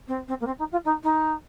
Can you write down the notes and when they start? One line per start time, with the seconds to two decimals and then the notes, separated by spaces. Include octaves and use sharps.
0.07 C4
0.27 C4
0.40 A#3
0.46 C4
0.58 D#4
0.71 F4
0.84 D#4
1.03 D#4